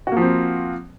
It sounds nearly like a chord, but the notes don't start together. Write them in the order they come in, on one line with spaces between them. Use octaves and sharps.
F#4 A#3 F3 C4